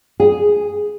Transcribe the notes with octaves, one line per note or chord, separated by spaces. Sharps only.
G#4